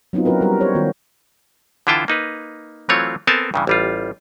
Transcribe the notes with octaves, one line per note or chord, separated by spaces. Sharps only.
F#3 B3 C4 D#4 F4
F#3 C#4 E4 F#4 A#4 B4
G3 A#4
G4 C5 C#5
D#3 A#3 B3 F#4
D3 E3 E4 F4 G5 A5
A#3 D#4 B4
E3 F#3 A3 C4 F4 C#5
B3 C4 A4 A#4 G#5 A5
G2 C#3 E3
A1 G3 F4